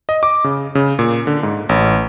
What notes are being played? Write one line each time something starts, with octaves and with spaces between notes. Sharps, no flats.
D#5
D6
C#3
C#3
A#2
D3
G#2
A1